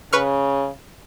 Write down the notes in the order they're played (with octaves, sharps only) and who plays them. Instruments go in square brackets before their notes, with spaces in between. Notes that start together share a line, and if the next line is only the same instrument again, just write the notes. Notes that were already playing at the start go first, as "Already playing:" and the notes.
[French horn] C#3 [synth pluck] B4 C#6 F6